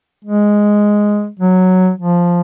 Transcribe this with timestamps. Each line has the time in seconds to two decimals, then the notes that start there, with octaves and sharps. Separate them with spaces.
0.25 G#3
1.39 F#3
1.98 F3